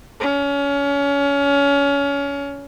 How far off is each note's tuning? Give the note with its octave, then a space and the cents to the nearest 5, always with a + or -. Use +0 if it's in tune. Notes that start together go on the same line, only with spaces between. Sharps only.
C#4 +25